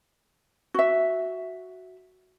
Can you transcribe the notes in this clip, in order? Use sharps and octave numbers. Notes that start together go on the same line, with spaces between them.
F#4 E5